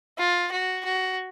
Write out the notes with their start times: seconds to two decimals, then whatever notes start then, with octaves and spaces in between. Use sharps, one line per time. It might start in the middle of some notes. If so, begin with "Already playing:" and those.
0.18 F4
0.52 F#4
0.85 F#4